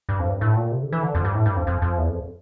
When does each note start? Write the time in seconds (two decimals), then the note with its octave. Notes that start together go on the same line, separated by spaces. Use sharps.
0.09 G2
0.19 F2
0.30 G2
0.41 A2
0.56 A#2
0.72 C3
0.83 D3
0.93 E3
1.03 D3
1.15 F2
1.25 G2
1.35 A2
1.46 G2
1.57 F2
1.67 F2
1.82 F2
1.98 E2
2.09 F2